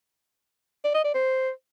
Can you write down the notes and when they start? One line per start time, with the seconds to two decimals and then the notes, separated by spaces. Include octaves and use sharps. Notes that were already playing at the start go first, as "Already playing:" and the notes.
0.84 D5
0.94 D#5
1.04 D5
1.14 C5